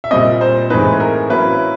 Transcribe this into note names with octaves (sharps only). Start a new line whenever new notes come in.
E5
A#2 G3 C4 D#5
C5
A2 E3 G#3 C4 D#4 B4
A#4
F#3 A#3 C#4 E4 B4